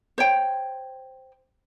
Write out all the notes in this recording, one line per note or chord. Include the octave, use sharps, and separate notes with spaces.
C5 C#5 G5